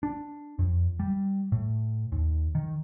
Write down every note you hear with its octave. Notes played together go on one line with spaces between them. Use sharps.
D4
F2
G3
A2
D#2
D#3